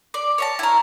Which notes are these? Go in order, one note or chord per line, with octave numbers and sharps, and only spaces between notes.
D5
C#5 E5 A5
E4 A#4